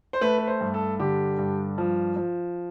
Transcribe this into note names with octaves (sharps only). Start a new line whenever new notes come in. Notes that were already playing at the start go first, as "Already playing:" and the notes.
C5
A3 B4
B4
C5
G2
A4
D3 G4
G2
F3
F3